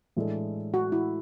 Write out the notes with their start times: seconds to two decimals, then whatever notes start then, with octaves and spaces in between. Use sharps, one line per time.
0.16 A2 E3 G#3 D4 A4
0.74 F#4
0.92 E4